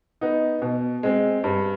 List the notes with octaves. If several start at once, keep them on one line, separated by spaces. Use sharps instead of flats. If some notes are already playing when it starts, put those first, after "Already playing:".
B3 D#4
B2
G#3 C4
G2